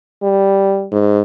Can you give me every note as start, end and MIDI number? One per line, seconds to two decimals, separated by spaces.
0.23 0.87 55
0.92 1.22 44